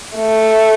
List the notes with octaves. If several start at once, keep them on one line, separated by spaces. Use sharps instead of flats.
A3